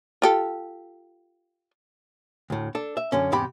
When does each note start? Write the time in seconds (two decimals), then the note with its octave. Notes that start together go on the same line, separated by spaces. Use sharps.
0.22 F4 G4 A4
2.50 D2 A2
2.75 D4 A4
2.97 E5
3.12 F#2 D3 C#4
3.32 E2 G#2 C3 G4 B5